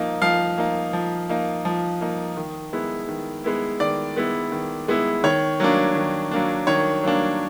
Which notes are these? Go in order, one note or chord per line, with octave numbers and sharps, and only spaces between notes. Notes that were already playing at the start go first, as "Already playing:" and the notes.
Already playing: F3 A#3 D#4
F3 F5
A#3 D#4
F3
A#3 D#4
F3
A#3 D#4
D#3
G#3 B3 E4
D#3
G#3 B3 E4
D#3 D5
G#3 B3 E4
D#3
G#3 B3 E4
D#3 C#5
F#3 A#3 D4
D#3
F#3 A#3 D4
D#3 C#5
F#3 A#3 D4